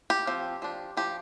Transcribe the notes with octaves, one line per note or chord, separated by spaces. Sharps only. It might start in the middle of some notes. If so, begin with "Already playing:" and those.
G4
F3 C4
F3 D4
F3 D4 G4